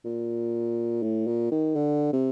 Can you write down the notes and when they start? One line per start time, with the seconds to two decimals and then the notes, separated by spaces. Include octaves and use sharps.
0.05 A#2
1.03 A2
1.27 A#2
1.51 D#3
1.76 D3
2.13 C3